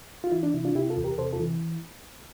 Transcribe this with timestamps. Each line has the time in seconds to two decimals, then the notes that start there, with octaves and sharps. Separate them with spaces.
0.24 F4
0.32 E3 E4
0.43 D4
0.54 C3 E4
0.65 D4 F4
0.75 C3 E4 G4
0.90 F4 A4
0.97 E2
1.04 G4 A#4
1.18 C3 A4 C5
1.33 F4 A4
1.40 E3